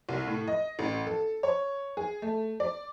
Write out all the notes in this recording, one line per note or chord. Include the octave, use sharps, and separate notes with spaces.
C2
A2
D#5
A1
A4
C#5
G#4
A3
D5